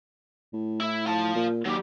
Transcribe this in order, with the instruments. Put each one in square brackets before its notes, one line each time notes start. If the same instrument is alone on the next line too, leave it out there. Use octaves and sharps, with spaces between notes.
[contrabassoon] A2
[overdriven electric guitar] E4
F4 A5
[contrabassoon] A#2
[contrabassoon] D#2 [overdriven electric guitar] F#3 G4